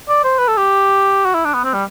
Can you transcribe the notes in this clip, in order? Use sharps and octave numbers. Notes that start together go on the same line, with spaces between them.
D5
C5
B4
A4
G4
F#4
E4
D4
B3
C4
G3